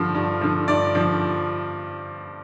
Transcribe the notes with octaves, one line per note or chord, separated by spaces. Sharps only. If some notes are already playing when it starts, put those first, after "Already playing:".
Already playing: G2 D3 F3
G2
D3 F3
G2 D5
D3 F3